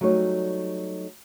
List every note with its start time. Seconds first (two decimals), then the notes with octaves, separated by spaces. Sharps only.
0.01 F#3 G3 A3 D#4 C#5